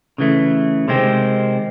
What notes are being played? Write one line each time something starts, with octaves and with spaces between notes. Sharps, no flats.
C#3 E3 A3
C3 D#3 G#3 C4